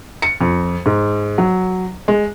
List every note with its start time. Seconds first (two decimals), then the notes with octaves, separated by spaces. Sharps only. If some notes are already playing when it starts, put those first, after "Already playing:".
0.22 C#7
0.41 F2
0.86 G#2
1.38 F#3
2.08 G#3